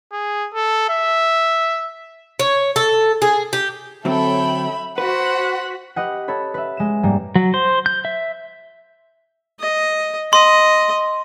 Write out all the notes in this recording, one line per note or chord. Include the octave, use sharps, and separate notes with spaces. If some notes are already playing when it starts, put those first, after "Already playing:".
G#4
A4
E5
C#5
A4
G#4
G4
D3 F#3 C4 A4 C#5 E5 G5 B5
F#4 B4 C5 F#5 B6
G4 B4 D#5 F#5
A4 C#5 B5
B4 E5
G#3 E7
G#2 G3 A#3
F#3
C5
G6
E5
D#5
D#5 C6